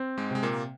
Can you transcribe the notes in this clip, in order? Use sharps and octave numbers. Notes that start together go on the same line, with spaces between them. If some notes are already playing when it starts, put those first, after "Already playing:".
Already playing: C4
G#2 G#3
C3 G#3
A#2 A#3